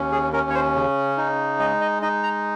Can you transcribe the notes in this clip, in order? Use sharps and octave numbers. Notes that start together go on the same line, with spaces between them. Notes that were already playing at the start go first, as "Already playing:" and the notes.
Already playing: D#2 C#4
G#4
C#4 A#4
C#5
C5
C#3
D#4
G#3 D#5
D#5
D#4 D#5
A#5